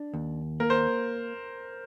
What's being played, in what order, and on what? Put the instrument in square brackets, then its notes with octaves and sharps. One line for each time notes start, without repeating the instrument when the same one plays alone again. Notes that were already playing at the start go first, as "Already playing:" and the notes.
Already playing: [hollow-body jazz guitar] D4
D#2
[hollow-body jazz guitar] A#3 [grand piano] A#4
[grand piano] C5